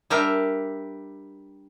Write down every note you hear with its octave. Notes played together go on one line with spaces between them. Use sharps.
G3 D4 G4 A#4 E5